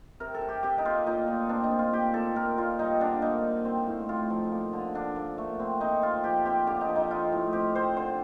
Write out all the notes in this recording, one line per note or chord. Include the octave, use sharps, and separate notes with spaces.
C3 A#4
A4
C3
G4
C3 G4
D#4
A#3 F4
A#2 D#4
A#2
C4 D4
D#4
C4
F4
A#2 G4
A#2 A4
A#2 A#4
A#2 F4
G3 D#4
D3 D4
A#3 D#4
D3
C4
A2
A2 F4
F3
A#3
D3
D3 D4
A#3
A3
C4
C4 D#4
C4 F4
F3 G4
C4 G4
D3 G4
D#4
F3
D#4
C4 F4
A2
C4 G4
C4 C5
D3 C5